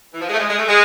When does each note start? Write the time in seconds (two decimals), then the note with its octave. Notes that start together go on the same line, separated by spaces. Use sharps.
0.13 E3
0.21 F3
0.29 G#3
0.34 A3
0.39 G#3
0.49 G#3
0.58 A3
0.68 G#3